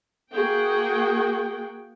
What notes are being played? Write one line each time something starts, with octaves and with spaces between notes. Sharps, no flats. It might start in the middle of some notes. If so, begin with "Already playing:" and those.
A#3 F#4 G#4 G5